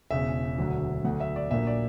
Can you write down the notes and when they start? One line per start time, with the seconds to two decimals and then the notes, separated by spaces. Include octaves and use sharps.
0.10 E1 E2 C#3 E5
0.58 E1 D2 D3 F#3
1.04 D2 D3 F#3 F#5
1.20 E5
1.36 D5
1.51 A#1 A#2 F#3 A#3 E5
1.67 D5